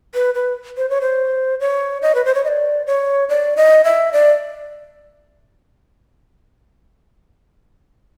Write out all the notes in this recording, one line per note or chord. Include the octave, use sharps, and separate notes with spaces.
B4
B4
C5
C#5
C5
C#5
D#5
B4
C5
C#5
D#5
D5
C#5
D5
D#5
E5
D5